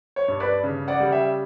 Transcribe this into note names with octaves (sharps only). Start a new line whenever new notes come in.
C#5
G2
B4 D5
C#3
D5 F#5
G3
E5 G5